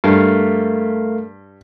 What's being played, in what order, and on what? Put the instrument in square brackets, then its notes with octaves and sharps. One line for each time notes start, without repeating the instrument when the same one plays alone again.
[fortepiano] G2 [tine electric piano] A3 A#4 F5